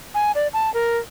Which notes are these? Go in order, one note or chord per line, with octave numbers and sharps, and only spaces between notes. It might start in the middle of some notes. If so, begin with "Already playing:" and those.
G#5
D5
A5
A#4